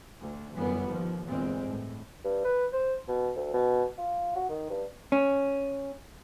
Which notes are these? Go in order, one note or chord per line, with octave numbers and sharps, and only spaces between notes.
D2
G1 F#2 E3 G3 B3
D#2 F3
G1 E2 A#2 G#3 C4
A2
G2
B4
C5
B2
D2
B2
F4
F#4
D#3
G2
C#4